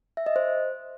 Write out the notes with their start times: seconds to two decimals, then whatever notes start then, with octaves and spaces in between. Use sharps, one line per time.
0.17 E5
0.26 D#5
0.36 C5